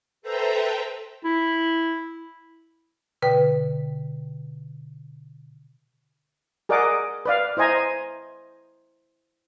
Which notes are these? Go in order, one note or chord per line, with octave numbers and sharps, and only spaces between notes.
A4 B4 C5 E5 G5 A#5
E4
B2 D3 B4 G5
G#4 A#4 D5 D#5 F#5 D6
B4 D5 F5
E4 C5 D#5 G#5 A#5